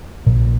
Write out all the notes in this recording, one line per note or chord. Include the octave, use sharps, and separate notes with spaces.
A#1 A#2